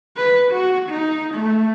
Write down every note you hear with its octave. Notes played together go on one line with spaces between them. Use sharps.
B4
F#4
D#4
A3